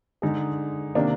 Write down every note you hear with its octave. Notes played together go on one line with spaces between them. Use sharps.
D3 G#3 D#4 G#4
C3 D#3 A#3 D4